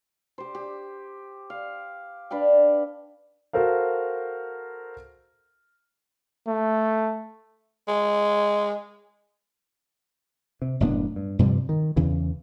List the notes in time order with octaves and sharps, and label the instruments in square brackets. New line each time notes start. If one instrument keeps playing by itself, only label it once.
[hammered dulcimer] G4 C5
G4
F5
D4 B4 F5 G5
[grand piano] F#4 A4 A#4 C5 F5
[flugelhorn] A3
[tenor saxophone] G#3
[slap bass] C3
F#1 A2 B3 D4
G2
G2 C3 F3 G3
D#3
E2 C#3 E3